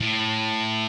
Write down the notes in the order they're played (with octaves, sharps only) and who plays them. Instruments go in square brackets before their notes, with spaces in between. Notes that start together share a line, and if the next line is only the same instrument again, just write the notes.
[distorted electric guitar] A2